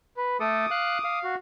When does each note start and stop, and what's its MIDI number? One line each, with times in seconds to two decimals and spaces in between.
0.17 0.37 71
0.40 0.66 57
0.40 0.66 69
0.40 1.19 86
0.40 1.19 87
0.71 0.98 77
0.71 0.98 90
1.04 1.35 77
1.24 1.36 66